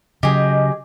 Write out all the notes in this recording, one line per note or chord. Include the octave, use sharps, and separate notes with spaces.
C#3 F#3 G4 G#4 D#5